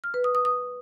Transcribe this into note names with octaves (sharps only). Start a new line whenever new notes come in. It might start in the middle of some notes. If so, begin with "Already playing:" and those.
F6
B4
D#6
D#6
D#6